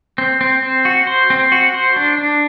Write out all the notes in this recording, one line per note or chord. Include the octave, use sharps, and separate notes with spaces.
C4
C4
C4
F#4
C5
C4
F#4
C5
D4
D4